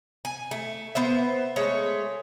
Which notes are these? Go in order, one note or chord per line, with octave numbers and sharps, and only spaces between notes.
G#5
A3
B3 C5 E5
G#3 A3 C#5